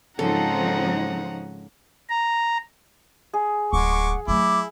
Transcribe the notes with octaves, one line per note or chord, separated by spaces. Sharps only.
G#2 C#3 F3 C4 D#4 A4 F#5 A#5
A#5
G#4
D1 G#3 F#5 C#6 D6
F#3 A3 E4 D6